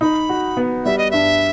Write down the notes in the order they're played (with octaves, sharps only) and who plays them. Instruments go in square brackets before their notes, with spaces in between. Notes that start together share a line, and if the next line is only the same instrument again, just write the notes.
[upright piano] D#4 [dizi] B5
[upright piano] F#4
B3
[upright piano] G3 [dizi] E5
[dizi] D#5
[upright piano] G2 [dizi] E5